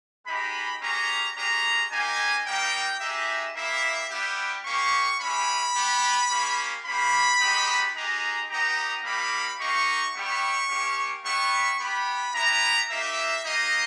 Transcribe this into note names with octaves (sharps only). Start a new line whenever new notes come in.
G#3 D#4 G4 B5
G#3 C#4 G4 A#5
G#3 C#4 G4 A#5
A#3 D#4 G4 G#5
G3 A#3 D#4 G4 G5
G#3 D#4 G4 E5
A#3 E4 G4 E5
G3 B3 E4 G4
A#3 C#4 G4 C#6
G#3 C#4 E4 G4 B5
B3 G4
A#3 C#4 G4
A#3 C#4 G4 B5
G#3 B3 D#4 G4
G#3 D#4 G4 A#5
B3 D#4 G4 A#5
G3 A#3 D#4 G4 B5
A#3 D#4 G4 C#6
G3 B3 E4 G4 C#6
A#3 C#4 G4
G3 B3 E4 G4 C#6
B3 G4 B5
B3 E4 G4 A#5
A#3 D#4 G4 E5
A#3 D#4 G4 D#5